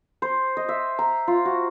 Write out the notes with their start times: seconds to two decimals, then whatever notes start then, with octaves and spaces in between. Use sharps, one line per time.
0.22 C5
0.57 D#5
0.69 E5
0.99 A#5
1.28 F4
1.45 F#4